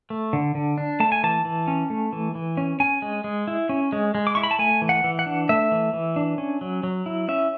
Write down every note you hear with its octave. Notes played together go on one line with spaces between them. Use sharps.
A3
D3
D3
D4
A3 A5
G#5
E3 A5
E3
C#4
A3
E3
E3
C#4
C#4 G#5
G#3
G#3
E4
C#4
G#3
G#3
D6
E4 C#6
B5
A5
A3 G#5
E3
F#5
E3
F#5
D4
A3 E5
E3
E3
D4
C#4
F#3
F#3
E4
C#4 E5